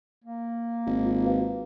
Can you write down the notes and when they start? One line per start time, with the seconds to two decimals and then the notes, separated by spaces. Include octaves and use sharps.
0.24 A#3
0.86 G#1
1.04 F4
1.24 F#4 B4 F5